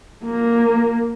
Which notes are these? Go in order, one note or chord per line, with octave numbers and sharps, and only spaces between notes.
A#3